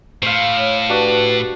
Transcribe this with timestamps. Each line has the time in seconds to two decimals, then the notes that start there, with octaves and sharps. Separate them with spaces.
0.23 A2 C5 F5
0.58 C#5
0.89 D4 F#4 G4 B4